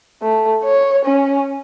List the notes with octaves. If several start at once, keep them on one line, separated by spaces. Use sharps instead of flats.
A3
C#5
C#4